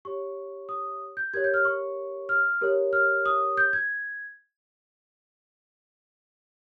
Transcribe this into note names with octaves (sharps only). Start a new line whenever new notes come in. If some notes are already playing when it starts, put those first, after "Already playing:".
G4 C#5 C#6
D#6
G6
G4 A#4 C#5 G#6
G6
F6
C#6
F6
G4 A#4 C#5
F6
D#6
G6
G#6